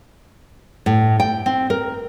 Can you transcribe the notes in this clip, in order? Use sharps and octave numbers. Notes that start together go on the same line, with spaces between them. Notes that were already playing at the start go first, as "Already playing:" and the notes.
A2
G5
C4
A#4